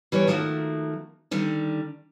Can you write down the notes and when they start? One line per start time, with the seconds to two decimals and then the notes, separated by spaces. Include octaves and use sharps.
0.12 E3 G3 B4 C#5
0.27 D#3 F3 A3 A#3 F#4
1.31 D3 D#3 G3